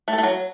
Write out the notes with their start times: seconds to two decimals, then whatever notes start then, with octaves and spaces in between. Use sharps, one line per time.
0.08 A3
0.13 A4
0.18 A3
0.23 F#3